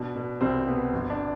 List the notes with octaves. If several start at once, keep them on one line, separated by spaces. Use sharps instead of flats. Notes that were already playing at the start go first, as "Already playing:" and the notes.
Already playing: B2 D4
B2
C2 C4
B2 B3
G1
D4